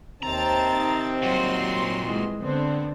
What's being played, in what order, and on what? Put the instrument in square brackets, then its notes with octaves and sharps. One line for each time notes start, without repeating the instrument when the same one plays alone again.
[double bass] D#2 [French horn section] C3 D#3 C4 [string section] A5 A6 [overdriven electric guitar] A#5
[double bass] D#4
[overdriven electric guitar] A#2 F#4 [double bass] F#3 [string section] G3 C6
[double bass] E3 G#3
[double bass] D3 D4 [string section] B3 C4